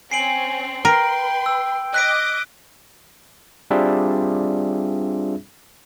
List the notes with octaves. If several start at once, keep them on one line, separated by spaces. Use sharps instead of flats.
C4 C#4 G#5 C7 D7 F#7
A#4 B4 G5 C6 D7
E6
D#5 D6 D#6 F#6 B6 D7
G3 C4 D4 F4 G#4 E5